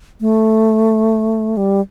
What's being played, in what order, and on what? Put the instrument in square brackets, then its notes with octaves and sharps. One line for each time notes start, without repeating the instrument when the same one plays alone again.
[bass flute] A3
G3